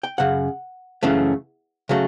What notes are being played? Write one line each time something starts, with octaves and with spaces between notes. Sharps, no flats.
G5
F#2 C#3 F#5
F#2 C#3 E3 A3
C#3 F#3 A3